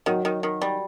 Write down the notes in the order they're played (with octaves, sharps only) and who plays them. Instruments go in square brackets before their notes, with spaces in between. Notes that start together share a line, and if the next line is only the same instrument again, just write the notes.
[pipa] D#3 [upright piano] F#3 F#4
[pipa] D#3
D#3
G3